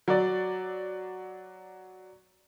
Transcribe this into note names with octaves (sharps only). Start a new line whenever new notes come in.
F#3 D5